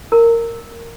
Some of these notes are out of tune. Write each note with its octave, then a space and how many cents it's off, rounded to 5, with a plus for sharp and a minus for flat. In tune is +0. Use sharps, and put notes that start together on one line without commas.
A#4 -15 A#5 -30